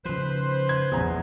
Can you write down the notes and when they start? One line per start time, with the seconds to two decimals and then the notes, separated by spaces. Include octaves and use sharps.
0.05 C#3 F3 B4 C5
0.69 G#6
0.92 A1 E2 F3 B3 A#5